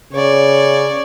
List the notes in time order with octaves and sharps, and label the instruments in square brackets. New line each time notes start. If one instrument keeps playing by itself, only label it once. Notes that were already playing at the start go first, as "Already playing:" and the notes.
[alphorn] C#3 [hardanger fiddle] C#5 D5